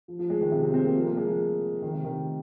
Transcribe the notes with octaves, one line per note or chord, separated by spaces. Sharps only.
F3
F3
G#3
D#3
C3
C4
C4
A#3
F3
A#3
G#3
F3
D#3
C3
D#3